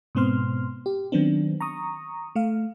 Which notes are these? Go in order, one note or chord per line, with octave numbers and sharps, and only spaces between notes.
G#2 B2 B3 C4 C6 F6
G4
D#3 F#3 B3 C4 D4
A#5 C#6 D#6
A3 F5